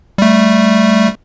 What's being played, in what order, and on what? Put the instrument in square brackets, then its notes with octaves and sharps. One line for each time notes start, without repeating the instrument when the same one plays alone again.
[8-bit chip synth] G3 A3